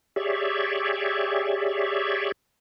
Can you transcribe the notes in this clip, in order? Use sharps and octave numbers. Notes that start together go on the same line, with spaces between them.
G4 G#4 C#5 D5 E5